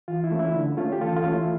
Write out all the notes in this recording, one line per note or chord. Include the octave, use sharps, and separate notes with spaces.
E3 F4
E4
A3 C#4
E4
D3
A3 C#4 F4
G4
E3 F4 A4
F4
A3 C#4
E4